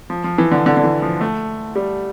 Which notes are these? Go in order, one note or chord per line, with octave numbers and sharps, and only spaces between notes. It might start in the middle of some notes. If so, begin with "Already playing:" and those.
F3
F3
E3
D3
D3
D3
E3
F3
A3
G3